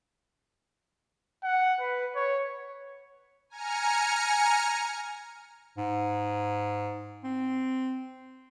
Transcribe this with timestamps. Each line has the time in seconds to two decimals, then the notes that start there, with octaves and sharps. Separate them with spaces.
1.44 F#5
1.80 B4
2.16 C#5
3.50 G#5 A#5 F6 C#7
5.78 G#2
7.24 C4